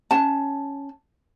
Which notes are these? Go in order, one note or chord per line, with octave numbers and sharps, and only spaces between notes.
C#4 A5